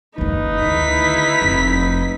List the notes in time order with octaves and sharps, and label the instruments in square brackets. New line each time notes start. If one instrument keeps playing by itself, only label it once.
[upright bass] F#1 D#2 [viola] D#4 B4
[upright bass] D2 D#3 [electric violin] E4 B6
[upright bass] F1